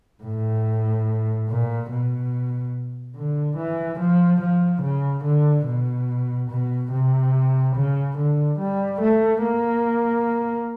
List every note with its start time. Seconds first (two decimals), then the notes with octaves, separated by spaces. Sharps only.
0.23 A2
1.49 A#2
1.91 B2
3.16 D3
3.57 E3
4.00 F3
4.41 F3
4.82 C#3
5.24 D3
5.67 B2
6.50 B2
6.92 C3
7.75 C#3
8.18 D3
8.59 G3
9.01 A3
9.43 A#3